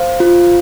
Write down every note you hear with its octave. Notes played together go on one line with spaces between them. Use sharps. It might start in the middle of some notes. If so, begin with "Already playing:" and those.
Already playing: C5 F5
F4